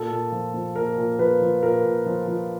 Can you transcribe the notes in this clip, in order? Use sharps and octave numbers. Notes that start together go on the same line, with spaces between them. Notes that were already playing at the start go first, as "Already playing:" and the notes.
Already playing: A#2 A4
A#2
F3
F3
A#2 A#4
A#2
F3 B4
F3
A#2 A#4
A#2
F3
F3